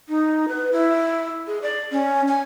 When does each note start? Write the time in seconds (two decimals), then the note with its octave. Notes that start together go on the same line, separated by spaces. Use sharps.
0.09 D#4
0.48 B4
0.72 E4
1.47 G#4
1.62 D5
1.92 C#4
2.28 G#5